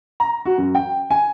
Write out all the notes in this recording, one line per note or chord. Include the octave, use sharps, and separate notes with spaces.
A#5
F#4
F#2
G5
G#5